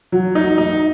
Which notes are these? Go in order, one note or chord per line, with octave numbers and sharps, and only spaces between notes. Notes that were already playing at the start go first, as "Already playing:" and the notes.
F#3
D#4
D#4